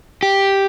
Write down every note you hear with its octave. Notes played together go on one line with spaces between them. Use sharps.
G4